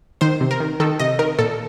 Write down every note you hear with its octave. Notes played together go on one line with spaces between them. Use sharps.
D#3 C5
C3
A#4
D#3
D#3 A4
C3 D#5
D#3 A#4
A#2 A4